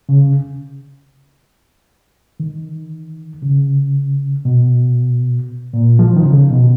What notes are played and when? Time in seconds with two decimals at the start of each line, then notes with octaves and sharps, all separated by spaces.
0.09 C#3
2.40 D#3
3.42 C#3
4.45 B2
5.73 A#2
5.99 F3
6.16 D#3
6.24 C#3
6.50 B2